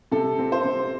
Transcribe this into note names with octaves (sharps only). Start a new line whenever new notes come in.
C3 A4
C4
C5
C3